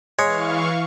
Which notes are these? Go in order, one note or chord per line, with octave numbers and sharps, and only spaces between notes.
E3 G#3 C#5 F5 C#6